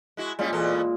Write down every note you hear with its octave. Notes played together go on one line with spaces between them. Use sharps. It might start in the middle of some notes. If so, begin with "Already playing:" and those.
G#3 E4 F#4
A#2 G3 G#3 C#4
E2 B2 A4